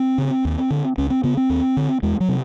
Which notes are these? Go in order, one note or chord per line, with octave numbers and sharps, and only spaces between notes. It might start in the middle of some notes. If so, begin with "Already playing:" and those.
Already playing: C4
C#3
D#2
D3
C#2 C#4
C4
C#3 B3
C4
D#2
D3
E2 G#3
F#3
C3